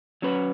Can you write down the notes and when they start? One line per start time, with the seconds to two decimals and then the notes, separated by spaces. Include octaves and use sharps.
0.22 F#3 C#4 F#4 B4